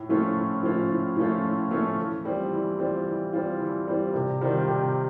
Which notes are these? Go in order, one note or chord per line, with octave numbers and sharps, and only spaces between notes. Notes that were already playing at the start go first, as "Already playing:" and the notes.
Already playing: A2
F3 A3 C#4 F4
A2
F3 A3 C#4 F4
A2
F3 A3 C#4 F4
A2
F3 A3 C#4 F4
E3
G3 C4 F4
E3
G3 C4 F4
E3
G3 C4 F4
E3
G3 C4 F4
C3
D#3 G3 C4 F4
C3